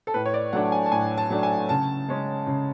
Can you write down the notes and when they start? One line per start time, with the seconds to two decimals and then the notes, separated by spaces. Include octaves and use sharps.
0.07 A4
0.14 A2 B4
0.26 C#5
0.34 D5
0.53 F#3 A3 D4 F#5
0.72 G#5
0.86 A5
0.92 A2 G#5
1.18 A5
1.30 F#3 A3 D4
1.43 G#5
1.69 C#3 A5
2.08 G#3 C#4
2.47 C#3